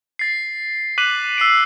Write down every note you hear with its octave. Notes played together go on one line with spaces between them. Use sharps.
A6 C7
D6 F#6 B6 D#7 F#7
E6 C7 D7